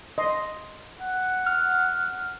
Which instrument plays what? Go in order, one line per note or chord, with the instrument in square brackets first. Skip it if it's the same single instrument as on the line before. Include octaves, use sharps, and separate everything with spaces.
[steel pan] D#5 C6
[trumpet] F#5
[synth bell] F6